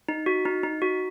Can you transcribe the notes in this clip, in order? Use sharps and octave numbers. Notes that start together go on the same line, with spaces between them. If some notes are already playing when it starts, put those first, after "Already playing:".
D#4
F#4
D#4
D#4
F#4